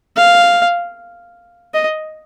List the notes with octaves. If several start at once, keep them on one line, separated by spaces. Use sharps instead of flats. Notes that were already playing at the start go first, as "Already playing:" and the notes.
F5
D#5